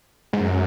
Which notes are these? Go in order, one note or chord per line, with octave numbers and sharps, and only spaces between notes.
G#2
F#2